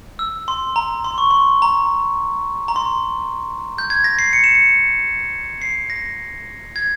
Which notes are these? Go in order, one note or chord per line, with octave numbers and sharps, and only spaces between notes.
E6
C6
A#5
C6
C#6
C6
A#5
A#5
C6
G6
G#6
A#6
C7
C#7
E7
C#7
C7
A#6
G#6